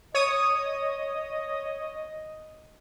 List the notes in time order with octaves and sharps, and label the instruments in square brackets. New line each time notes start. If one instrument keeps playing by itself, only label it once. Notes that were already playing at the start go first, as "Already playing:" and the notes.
[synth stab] C#5 D#6 [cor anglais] D#5